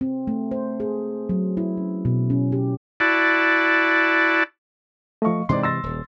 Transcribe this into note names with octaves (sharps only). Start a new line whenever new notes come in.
C4
A3
C5
G#4
F#3
E4
C#4
B2
C#4
G4
E4 F#4 D5 A5
F3 A3 D#5 F5 C#6
G#2 C3 E3 G#3 C4 D5 C6
C6 E6 A6 A#6
D#1